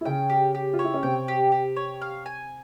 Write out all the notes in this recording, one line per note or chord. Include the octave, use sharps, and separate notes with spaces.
E4
C#3 C#4 G5
G4
G4
F4
C#5
E4
C#4
C3 C4 G5
G4
G4
C#5
F5
G#5